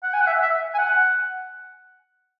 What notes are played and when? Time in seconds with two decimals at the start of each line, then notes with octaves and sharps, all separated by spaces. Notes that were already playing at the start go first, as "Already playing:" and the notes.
0.03 F#5
0.13 G#5
0.21 F#5
0.27 E5
0.43 E5
0.74 G#5
0.78 F#5